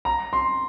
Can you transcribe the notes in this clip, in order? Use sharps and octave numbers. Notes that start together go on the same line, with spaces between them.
A#5
C6